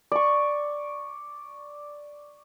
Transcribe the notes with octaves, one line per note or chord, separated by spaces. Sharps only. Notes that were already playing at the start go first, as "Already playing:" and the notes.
D5 C#6